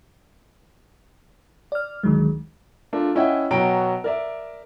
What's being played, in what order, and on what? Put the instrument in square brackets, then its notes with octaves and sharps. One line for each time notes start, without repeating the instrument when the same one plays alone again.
[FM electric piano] D5 F6
D2 D3 D#3 F#3 G#3
[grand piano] A3 D4 F4 A#4
C#4 E4 D#5 E5 F#5 G5
B2 F#3 F#5 G5 A#5 D7
A#4 D5 E5